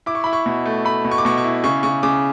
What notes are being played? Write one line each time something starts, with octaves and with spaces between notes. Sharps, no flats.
E4 D6
C#6
E4 B5
C#6
B2
A3
A3 B5
B2
C#6
D6
B2 C#6
C#6
E4
C#3 C#6
C#3 C#6
C#3 D6